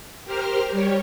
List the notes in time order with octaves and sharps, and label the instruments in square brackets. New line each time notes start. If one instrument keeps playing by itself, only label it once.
[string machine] G4 A#4 C5 F6
G3 G4 C#5